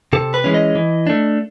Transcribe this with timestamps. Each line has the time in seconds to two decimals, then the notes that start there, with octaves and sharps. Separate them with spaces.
0.13 C3 A4
0.34 B4
0.44 E3 G#3 C#4
0.54 D#5
0.75 E3
1.07 A3 D4